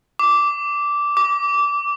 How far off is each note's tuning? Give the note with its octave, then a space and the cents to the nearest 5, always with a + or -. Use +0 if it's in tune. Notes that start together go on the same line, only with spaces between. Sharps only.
D6 -10
D6 -20